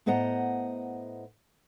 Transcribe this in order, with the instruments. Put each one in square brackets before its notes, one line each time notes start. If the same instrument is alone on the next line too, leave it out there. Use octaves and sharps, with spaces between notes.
[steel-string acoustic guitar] A2 B3 C5 D#5 F#5 A#5